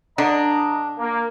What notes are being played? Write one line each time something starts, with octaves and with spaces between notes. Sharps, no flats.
D3 D4 D#5 A#5
A#3